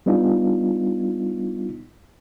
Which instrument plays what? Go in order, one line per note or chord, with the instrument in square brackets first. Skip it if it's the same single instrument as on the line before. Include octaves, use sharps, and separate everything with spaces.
[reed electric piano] G3 B3 D4 D#4 F4